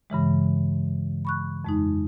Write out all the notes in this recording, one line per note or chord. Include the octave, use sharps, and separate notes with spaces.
G2 C#3 E3 G#3
B5 C#6 F#6
F2 G#3 D#4